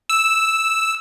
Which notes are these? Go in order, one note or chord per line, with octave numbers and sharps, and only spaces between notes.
E6